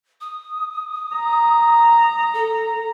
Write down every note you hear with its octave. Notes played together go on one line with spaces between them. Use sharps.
D#6
A#5
A4